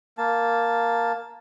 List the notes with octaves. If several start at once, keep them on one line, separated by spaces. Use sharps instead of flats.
A#3 A5